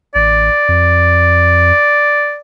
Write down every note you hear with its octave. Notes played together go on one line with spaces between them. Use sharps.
A1 D5
F2